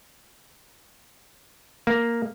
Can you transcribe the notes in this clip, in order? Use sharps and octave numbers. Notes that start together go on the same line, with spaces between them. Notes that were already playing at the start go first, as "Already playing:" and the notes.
A#3